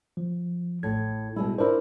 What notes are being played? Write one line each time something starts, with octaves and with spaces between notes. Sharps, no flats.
F3
A1 A2 G#6
B2 G3 G#3 E4
D4 E4 A#4 C5